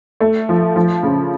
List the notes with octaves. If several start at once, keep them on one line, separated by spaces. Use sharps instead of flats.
A3
F3
F3
C#3